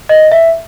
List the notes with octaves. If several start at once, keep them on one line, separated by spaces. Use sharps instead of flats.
D#5
E5